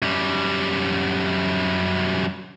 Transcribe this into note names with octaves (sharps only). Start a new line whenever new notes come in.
F#2 G3